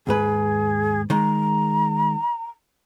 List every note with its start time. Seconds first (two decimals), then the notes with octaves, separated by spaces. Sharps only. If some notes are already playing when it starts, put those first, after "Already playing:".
0.07 D#2 G#2 G#4 B4
1.10 D#3 G#3 A#5